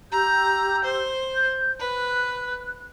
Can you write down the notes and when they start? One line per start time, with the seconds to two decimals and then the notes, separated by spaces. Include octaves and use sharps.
0.12 G4 A#5 E6 G6
0.84 C5
1.34 G6
1.80 B4 F#6